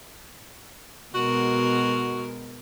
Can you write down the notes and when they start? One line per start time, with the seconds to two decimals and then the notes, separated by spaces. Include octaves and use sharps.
1.15 B2 G#3 F#4 A#4